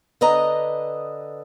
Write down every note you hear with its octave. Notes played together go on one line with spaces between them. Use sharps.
D3 B4 D#5 A#5